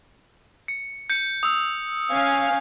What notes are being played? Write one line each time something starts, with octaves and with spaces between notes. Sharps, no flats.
C#7
G6 C#7
D#6 E6
C#4 F5 G#5